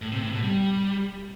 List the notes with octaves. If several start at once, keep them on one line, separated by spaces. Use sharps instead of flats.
A2
C3
A2
B2
G3